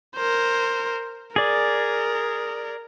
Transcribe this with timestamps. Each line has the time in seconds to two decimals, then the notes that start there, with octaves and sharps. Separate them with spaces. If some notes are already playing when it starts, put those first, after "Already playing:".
0.16 A#4 C5
1.36 G#4 A#4 D5